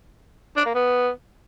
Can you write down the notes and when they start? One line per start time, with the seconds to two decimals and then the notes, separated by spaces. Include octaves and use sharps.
0.56 D4
0.65 A#3
0.75 B3